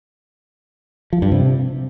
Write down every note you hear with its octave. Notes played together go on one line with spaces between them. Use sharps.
F3
G2
C3